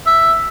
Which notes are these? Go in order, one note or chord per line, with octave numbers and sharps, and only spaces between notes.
E5